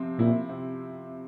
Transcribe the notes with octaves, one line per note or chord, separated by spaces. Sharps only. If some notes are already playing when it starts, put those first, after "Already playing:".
Already playing: C3 F3 C4
A#2 E4
C3